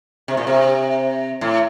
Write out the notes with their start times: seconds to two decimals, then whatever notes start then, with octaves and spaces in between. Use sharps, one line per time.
0.28 C3
0.37 A#2
0.47 C3
1.41 A2